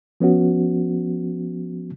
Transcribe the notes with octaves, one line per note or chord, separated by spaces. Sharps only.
F3 B3 C#4 F#4